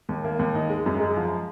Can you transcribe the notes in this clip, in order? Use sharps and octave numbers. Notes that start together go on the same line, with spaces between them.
D#2
A#3
D#2
D#4
G#3
F#2
G#3
F3